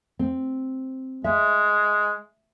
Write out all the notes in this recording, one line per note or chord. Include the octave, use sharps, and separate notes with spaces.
C4
G#3 E5